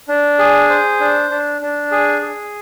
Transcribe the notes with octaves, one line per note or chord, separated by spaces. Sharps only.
D4
G#4
C5
D4
D4
D4
G#4
G#4